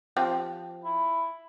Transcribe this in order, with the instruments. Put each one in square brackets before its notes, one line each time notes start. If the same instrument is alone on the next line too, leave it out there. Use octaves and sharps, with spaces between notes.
[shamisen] F3 C4 G4
[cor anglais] E4